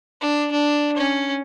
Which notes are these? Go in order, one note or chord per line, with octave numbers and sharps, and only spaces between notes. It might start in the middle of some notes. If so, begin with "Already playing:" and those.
D4
D4
C#4